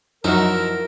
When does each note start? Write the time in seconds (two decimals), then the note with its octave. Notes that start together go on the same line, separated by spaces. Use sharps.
0.24 F#2 F3 F#3 D#4 E4 F#4 A#4